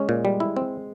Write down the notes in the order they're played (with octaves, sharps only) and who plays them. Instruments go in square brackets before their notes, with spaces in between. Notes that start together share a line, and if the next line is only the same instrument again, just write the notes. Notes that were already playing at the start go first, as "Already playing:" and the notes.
Already playing: [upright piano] G#3 [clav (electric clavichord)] C#4
[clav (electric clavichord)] A#2
G3
E4
C4